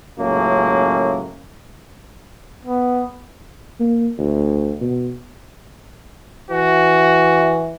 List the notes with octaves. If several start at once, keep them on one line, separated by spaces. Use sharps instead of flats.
C#2 F#2 A2 A#3
B3
A#3
D2
B2
E3 F#4